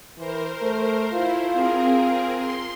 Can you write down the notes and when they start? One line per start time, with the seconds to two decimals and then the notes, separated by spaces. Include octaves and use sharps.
0.18 E3 A#4 C5
0.62 A3
1.13 E4 F4 C5
1.53 C4 G#4 A#4
2.39 C6